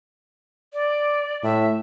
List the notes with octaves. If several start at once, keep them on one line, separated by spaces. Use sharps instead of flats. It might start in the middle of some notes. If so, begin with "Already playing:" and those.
D5
A2 E5